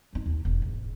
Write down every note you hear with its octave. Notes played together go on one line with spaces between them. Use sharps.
C4 D#4
D#2
E1
G#2